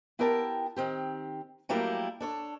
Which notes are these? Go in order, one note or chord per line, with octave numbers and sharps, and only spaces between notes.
B3 E4 G4 A#4 G5 A5
D#3 C4 G4
F#3 G3 A3 A#3 E4 G4
D4 A4 C#5